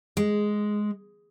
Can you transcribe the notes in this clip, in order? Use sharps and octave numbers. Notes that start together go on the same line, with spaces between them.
G#3